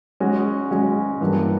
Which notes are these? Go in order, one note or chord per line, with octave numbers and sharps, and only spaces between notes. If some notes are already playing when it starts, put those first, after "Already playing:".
G#3 C#4 F#4
G#3 C#4 F#4
G2 E3 G3 A#3